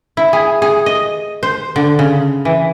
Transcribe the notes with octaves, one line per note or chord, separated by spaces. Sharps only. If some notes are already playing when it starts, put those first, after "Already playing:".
E4
G#4
G#4
D#5
C5
D3
C#3
E3